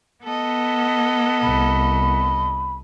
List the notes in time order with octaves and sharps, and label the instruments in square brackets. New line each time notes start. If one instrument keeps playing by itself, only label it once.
[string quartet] B3 [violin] A4 D#5
[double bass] C2 [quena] B5